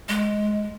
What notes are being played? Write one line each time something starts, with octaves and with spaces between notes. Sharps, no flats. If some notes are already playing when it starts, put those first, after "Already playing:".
G#3